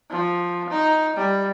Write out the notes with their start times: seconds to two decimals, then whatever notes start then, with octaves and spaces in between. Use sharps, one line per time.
0.10 F3
0.70 D#4
1.17 G3